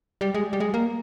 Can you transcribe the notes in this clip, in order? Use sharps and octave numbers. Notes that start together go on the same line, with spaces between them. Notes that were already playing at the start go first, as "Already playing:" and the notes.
G3
G#3
G3
G#3
A#3